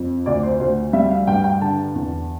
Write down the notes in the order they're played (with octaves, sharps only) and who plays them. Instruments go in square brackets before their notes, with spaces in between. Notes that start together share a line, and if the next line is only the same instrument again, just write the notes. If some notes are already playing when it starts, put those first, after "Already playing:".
Already playing: [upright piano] F2
D2 D5
C5
D2 C5
G3 E5
F5
G2 G5
G5
D3 A5
E2